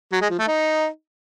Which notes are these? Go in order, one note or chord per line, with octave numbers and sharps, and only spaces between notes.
F#3
G#3
F3
A3
D#4